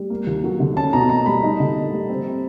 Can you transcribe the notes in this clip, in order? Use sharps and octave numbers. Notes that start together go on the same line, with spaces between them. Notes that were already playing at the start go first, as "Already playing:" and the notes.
Already playing: G3
A#3
D#2
F#3
D3
C#4 A5
B2 A#5
A#3 A#5
G3 B5
D#4
D3
A#3
G3
C4